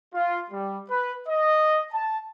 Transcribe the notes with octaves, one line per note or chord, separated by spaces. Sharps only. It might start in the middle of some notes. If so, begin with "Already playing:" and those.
F4
G3
B4
D#5
A5